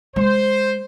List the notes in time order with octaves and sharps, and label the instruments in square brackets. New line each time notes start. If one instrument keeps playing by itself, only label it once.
[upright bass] G#3 [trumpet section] C5